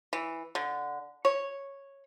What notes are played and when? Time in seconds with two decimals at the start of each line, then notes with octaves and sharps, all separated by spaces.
0.13 E3
0.55 D3
1.25 C#5